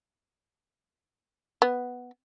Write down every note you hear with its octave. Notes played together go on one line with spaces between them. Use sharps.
B3